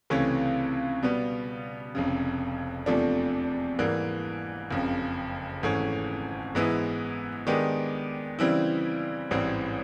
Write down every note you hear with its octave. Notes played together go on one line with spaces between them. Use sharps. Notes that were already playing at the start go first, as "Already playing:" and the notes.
C#2 C3 E3 A3 C#4
B2 G3 B3
F1 F2 C#3
E2 C3 F3 A3 D4
G#2 E3 G3 A#3
F#1 F2 C#3
G#1 G#2 E3 A3 C#4
G#2 E3 G#3 B3 E4
D#3 G#3 B3 D4 G4
C#3 E3 G3 C4 E4
A1 G#2 E3 G3 C4